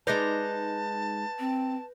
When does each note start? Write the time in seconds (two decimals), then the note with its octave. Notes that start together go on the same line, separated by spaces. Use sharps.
0.07 G#3 D#4 B4 D5 A5 G6 A#6
1.39 C4